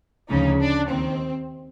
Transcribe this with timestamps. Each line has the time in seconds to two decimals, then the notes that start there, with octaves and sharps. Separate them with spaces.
0.28 D2 C#3 F3 D#4
0.59 D4
0.89 D#2 D#3 C4